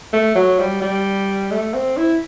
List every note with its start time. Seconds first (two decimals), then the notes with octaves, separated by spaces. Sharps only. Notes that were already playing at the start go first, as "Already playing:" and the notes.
0.13 A3
0.35 F#3
0.59 G3
0.82 G3
1.51 A3
1.74 C4
1.97 E4